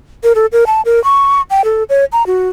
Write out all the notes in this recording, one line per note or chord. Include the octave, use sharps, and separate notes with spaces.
A#4
A4
A#4
A5
A#4
C#6
G5
A4
C#5
A#5
F#4